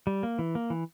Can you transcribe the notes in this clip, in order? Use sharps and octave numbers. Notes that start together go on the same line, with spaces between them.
G3
A#3
E3
A#3
E3